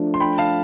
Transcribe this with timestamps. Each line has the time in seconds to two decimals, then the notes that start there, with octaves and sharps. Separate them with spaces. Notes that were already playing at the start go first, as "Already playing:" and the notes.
Already playing: F3 A3 D4
0.14 C6
0.20 G5 B5
0.38 F5 A5